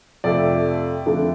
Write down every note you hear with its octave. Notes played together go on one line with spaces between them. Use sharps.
F2 C3 F3 A3 D5
F2 D3 A3 D4